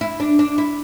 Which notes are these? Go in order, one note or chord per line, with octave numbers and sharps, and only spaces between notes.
E4
D4
D4
E4